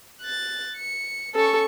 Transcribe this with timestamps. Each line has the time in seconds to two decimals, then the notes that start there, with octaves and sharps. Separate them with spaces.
0.21 F#6 A6
0.77 C#7
1.35 C#4 A4 C#6